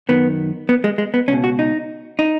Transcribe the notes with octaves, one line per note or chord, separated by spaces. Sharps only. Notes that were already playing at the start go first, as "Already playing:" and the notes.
F#2 D#3 B3
B3
G#3
G#3
B3
C#2 B2 C#4
F#4
D#4
D#4